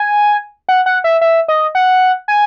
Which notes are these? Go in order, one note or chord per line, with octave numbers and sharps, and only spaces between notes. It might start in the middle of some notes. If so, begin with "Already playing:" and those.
Already playing: G#5
F#5
F#5
E5
E5
D#5
F#5
G#5